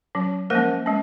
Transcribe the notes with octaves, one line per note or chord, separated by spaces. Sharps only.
F#3 C#4
F3 G#3 A#3 C#4 A#4
G#3 C#4